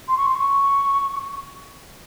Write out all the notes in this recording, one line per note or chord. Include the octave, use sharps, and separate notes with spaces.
C6
C#6
C6
C#6